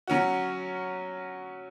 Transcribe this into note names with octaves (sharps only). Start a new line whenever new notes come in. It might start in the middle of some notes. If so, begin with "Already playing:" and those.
F#3 C#4 F#4